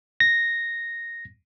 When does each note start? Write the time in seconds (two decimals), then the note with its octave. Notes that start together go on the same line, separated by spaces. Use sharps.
0.20 A#6